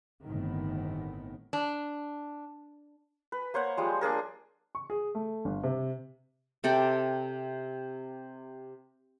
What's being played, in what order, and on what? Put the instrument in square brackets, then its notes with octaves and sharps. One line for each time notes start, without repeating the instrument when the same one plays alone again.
[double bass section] G1 A2 D#3 B3 C4
[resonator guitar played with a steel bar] D4
[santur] B4
A#3 C5 C#5 F#5
F3 G3 G#3
A#3 D4 G#4 A#4
[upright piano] C#6
G#4
A3
G1
C3
[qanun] C3 A4 D5 G5